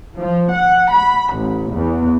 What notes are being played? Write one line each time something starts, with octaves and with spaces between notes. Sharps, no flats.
F3
F#5
B5
A1
E2